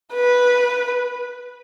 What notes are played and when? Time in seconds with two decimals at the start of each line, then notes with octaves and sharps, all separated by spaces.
0.13 B4